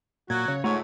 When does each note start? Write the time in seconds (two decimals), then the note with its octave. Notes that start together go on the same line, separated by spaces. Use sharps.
0.30 A#2 F#3 F#4 G#6
0.48 C#3 C#5
0.64 G#2 A3 F4 C#5 F#5 A#5